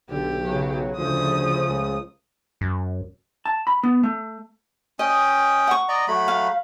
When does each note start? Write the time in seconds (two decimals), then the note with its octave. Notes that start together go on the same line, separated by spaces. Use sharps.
0.10 B1 D3 G4
0.43 C#3 F#3
0.97 D2 C#3 F3 A3 D#6
1.66 C#2
2.61 F#2
3.46 A5
3.67 B5
3.83 B3
4.03 A3
4.99 C#4 D#5 G5 D#6
5.67 F#5 C#6
5.89 D5 D#5 A#5
6.08 F#3 A3 B5
6.28 F5